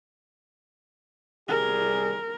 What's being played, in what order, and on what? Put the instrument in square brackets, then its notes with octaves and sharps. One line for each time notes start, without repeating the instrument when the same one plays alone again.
[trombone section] C2 G3 G#4 [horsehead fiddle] A#4